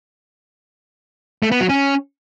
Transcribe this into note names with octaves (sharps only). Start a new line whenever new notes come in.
A3
B3
F#3
C#4